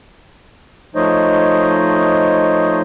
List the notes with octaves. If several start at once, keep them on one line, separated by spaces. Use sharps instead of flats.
F3 A3 D#4 C5 C#5 D#5